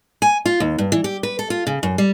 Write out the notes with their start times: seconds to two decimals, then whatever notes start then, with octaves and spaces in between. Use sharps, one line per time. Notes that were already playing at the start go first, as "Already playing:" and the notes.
0.22 G#5
0.46 F4
0.60 D#2
0.78 G2
0.92 E3
1.04 G4
1.23 B4
1.39 A4
1.50 F4
1.67 C#3
1.83 F#2
1.98 G3